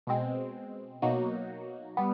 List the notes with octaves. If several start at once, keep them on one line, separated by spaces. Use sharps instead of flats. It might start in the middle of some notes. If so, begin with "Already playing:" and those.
B2 G#3 C4
B2 F#3 A#3 D#4 F#4
G3 B3